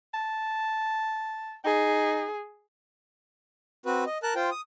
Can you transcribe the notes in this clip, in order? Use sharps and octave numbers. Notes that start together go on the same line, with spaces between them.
A5
D#4 G#4
C4 F#4 B4
D#5
A#4 A5 F#6
F4 C5 G5
D#6